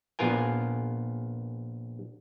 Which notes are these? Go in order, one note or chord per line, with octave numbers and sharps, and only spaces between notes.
A#1 B3 F4 A#4 G#5